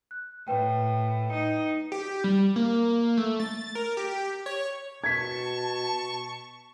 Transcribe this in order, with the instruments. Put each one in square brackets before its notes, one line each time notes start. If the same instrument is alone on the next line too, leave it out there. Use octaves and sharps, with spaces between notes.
[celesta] F#6
[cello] A2 [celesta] B4 G5
[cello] D#4
[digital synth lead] G4
G3
A#3
A3
A6
A#4
G4
C#5
[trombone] B2 [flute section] A5 [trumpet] C#6 [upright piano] G#6 B6